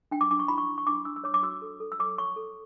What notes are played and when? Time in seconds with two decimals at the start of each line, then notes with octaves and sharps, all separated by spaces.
0.11 D4 G5
0.21 D6
0.31 D4 D6
0.39 C#6
0.48 E4 B5
0.58 C#6
0.67 E4
0.78 C#6
0.87 D4 D6
1.05 D4 E6
1.16 E6
1.24 C#5 D6
1.34 D6
1.43 F#4 E6
1.62 A4
1.80 A4
1.92 E6
1.99 C#5 D6
2.18 C#5 C#6
2.36 A4